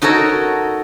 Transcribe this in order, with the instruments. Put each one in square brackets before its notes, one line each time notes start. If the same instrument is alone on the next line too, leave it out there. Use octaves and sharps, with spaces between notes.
[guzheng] D#4 F#4 A4 A#4 C#5